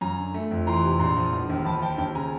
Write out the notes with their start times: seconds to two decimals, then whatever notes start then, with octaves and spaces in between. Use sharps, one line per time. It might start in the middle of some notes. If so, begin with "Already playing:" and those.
0.01 F#2 G#5 A#5
0.18 D3
0.34 A3
0.51 F2
0.67 E3 A#5 C6
0.84 C3
0.99 A#1 A#5 C6
1.17 F3
1.33 E1
1.49 D#2
1.65 F3 A5 B5
1.81 F3 G5 A5
1.98 D#2 G5 A5
2.15 C#3 G#5 A#5